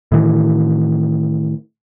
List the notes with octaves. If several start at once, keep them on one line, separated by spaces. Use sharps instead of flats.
A2 D#3 E3